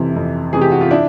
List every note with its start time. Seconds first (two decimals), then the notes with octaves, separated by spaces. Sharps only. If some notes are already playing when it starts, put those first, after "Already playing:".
Already playing: F2 C3 E3 E4
0.16 F2
0.53 C3 E3 G#4
0.61 G4
0.72 F#4
0.81 F4
0.91 D4 E4